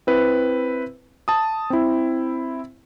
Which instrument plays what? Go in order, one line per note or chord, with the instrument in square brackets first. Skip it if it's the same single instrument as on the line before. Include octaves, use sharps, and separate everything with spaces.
[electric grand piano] C4 E4 B4
A5 D#6
C4 E4